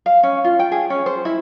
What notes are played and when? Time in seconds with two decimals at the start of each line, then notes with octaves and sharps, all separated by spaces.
0.06 F5
0.23 C#4
0.44 F4
0.59 G5
0.72 G#4
0.90 C#4
1.06 C5
1.25 E4